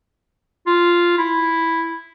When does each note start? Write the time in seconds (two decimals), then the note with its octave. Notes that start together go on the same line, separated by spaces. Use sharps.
0.67 F4
1.18 E4